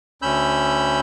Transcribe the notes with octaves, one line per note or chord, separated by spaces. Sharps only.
D2 C#4 B5 E6 G6